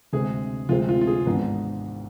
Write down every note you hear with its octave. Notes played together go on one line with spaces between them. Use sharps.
D2 C3 G#3 C4 G#4
D2 C3 G#3 C4 F4
F4
F4
G#4
G#1 G#2 E3 B3 D4